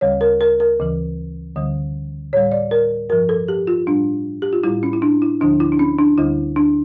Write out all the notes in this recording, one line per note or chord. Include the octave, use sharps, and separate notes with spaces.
D2 C#3 G3 C#5
A#4
A#4
A#4
D2 C#3 E3
D2 D3 G3
A2 G3 C#5
D5
A#4
G2 F3 A#4
A4
G4
F4
A2 G3 D4
G4
F4
A2 G3 E4
C#4
E4
D4
E4
D2 D3 F3 D4
E4
D4
C#4
D4
D2 D3 G3 E4
D4